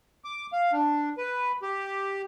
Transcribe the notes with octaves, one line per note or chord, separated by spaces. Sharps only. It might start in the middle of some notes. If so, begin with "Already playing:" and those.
D6
F5
D4
B4
G4